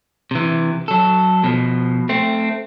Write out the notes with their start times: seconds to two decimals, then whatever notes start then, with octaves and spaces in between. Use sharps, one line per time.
0.31 C3 E3
0.88 F#3 A4
1.44 B2 F3
2.09 A3 C4